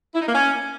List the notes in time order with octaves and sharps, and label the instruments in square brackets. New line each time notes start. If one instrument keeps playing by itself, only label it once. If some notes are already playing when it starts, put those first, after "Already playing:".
[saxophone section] E4
D#4
A#3
C#4